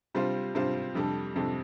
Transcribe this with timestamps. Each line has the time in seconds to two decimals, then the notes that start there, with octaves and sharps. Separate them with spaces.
0.14 C3 G3 D4 F4 C5
0.55 C3 G3 D4 F4 C5
0.95 F2 C3 G3 D4 A4
1.36 F2 C3 G3 D4 A4